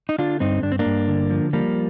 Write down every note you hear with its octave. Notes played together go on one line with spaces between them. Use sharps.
D#4
D3 D4 F4
G2 C4 D#4
G2 D4
C4
A#3 D4
G2
D3
F3
F3 G3 A#3